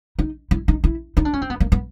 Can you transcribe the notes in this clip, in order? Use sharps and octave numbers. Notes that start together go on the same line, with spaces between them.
D#4
E4
D#4
E4
D#4
D4
C#4
C4
B3
A#3
B3